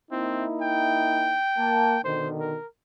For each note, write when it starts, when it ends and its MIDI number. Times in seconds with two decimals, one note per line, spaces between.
0.11 1.40 58
0.11 0.45 60
0.11 1.40 63
0.11 1.40 64
0.61 2.04 79
1.57 1.96 58
1.57 1.96 81
2.04 2.56 47
2.04 2.56 50
2.04 2.56 51
2.04 2.28 72
2.40 2.66 70